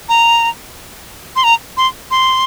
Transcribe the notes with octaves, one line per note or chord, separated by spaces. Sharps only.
A#5
C6
A#5
C6
C6